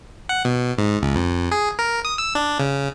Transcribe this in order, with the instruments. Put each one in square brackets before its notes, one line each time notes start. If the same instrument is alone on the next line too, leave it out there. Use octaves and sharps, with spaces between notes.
[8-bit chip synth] F#5
B2
G#2
C#2
F2
G#4
A#4
D#6
E6
D4
C#3